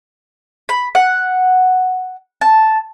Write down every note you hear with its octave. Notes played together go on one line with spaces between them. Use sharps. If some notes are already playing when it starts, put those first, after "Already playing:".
B5
F#5
A5